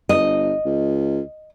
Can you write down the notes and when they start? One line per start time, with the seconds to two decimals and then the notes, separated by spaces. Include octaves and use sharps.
0.09 G1 D#5
0.65 C#2